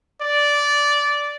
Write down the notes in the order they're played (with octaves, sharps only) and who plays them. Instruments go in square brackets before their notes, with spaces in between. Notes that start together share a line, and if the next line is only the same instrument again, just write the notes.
[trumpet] D5